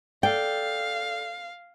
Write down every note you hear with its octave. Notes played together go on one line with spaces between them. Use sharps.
A4 D5 F5 G5